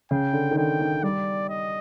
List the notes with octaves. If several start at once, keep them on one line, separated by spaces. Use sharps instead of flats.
C#3 G5
D3
D#3
D3 G5
D#3
G3 D5
D#5